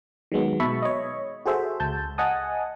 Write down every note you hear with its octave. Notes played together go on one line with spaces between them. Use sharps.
D#3 F#3 G#3 B3
B2 E5 A5 B5 C#6
C#5 D#5
F#4 G#4 A4 C5 E5
C#2 A5 G6
D#5 F#5 G#5 A5 D#6